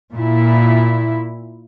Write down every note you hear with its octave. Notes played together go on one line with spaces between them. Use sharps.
A#2 E4